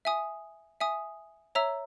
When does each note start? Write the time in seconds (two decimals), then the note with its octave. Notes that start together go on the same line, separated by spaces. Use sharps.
0.05 E5 G#5 D#6
0.80 E5 G#5 D#6
1.55 C#5 E5 A#5 E6